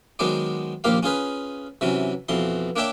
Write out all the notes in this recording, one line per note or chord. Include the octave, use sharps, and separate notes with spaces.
D#3 F#3 G#3 B3 C5 D5
A#1 D#2 A#3 G4 F5
C#4 F4 G#4 B4
C3 E3 F#3 C#4
F2 B2 E3 C6
A#3 D4 C#5 E5 G5 A5